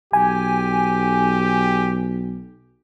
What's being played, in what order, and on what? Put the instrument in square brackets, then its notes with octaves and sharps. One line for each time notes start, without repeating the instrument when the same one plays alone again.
[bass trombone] B1 [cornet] G4 [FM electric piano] G#5